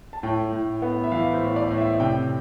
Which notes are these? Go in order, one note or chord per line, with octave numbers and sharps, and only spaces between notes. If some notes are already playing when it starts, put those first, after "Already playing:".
A5
A2 G5
A2
B3
E5
E3 F5
C5
A2
D5
A2
E5
C3 G5